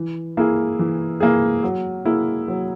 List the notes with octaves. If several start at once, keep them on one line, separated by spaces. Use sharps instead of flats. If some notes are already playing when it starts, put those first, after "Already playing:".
Already playing: E3
A#3 E4 G#4
E3
A#3 E4 G#4
F#3
A#3 E4 G#4
F#3